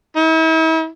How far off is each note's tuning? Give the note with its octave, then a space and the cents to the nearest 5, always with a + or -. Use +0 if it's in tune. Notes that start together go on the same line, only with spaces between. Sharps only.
E4 -40